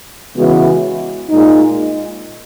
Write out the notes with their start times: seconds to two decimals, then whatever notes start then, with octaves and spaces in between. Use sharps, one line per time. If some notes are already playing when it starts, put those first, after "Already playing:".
0.36 C#3 E3 G#3 B3 F#4
1.30 A#2 G#3 D#4